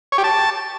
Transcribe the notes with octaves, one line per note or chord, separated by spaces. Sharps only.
C#5
G4
A5